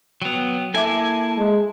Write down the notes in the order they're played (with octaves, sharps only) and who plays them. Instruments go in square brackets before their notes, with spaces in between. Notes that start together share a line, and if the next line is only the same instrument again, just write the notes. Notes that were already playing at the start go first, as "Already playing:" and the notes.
[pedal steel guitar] F#3 B3 [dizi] G5 [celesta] D7 F7
[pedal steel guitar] A#3 E4 G#5 [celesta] A4 E5 D6 [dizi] A5
[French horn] G#3